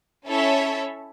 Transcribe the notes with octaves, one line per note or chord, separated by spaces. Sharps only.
C#4 E4 A4 C#5 E5